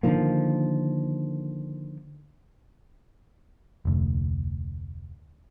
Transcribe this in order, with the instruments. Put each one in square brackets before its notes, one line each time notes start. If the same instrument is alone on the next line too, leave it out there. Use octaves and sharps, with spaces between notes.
[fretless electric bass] D3 D#3 F3 A#3
[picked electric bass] F1 D2